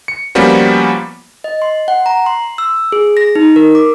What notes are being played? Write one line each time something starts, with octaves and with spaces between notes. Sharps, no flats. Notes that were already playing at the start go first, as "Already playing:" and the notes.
C#7
F3 G3 A#3 B3 C#4 F#4
D#5
C6
F#5
A#5
C6
E6
G#4
A#6
D#4
A#4
D6